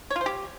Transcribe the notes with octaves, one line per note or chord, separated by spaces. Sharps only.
C#5
F4
C5
G4